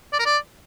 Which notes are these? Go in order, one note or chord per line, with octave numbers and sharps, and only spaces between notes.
D5
A#4
D5